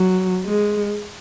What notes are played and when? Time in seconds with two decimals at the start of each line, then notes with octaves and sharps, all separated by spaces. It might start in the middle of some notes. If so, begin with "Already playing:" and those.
Already playing: F#3
0.45 G#3